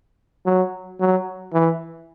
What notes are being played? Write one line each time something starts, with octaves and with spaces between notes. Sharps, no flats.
F#3
F#3
E3